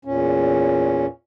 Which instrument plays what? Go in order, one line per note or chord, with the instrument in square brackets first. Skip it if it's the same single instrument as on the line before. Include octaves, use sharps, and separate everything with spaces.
[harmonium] E2 A#2 C#4